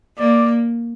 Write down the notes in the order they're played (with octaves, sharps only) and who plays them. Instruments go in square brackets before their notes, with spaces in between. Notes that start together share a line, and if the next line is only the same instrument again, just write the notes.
[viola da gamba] A#3 [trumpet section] D5